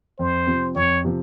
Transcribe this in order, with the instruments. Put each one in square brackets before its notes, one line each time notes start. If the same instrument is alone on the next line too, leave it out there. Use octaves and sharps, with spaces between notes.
[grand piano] F2 [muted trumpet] C5
[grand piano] C3 F3 C4
[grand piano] F2 [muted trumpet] C#5
[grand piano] C3 F3 C4